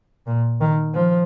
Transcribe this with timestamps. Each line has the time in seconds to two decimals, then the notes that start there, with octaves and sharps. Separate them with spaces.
0.27 A#2
0.61 D#3
0.94 F3